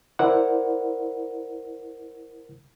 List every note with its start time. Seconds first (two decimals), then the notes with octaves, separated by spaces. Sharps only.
0.19 E4 A#4 C5 D5 F#5